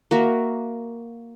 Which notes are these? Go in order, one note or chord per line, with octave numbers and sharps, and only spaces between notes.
A#3 F#4 E5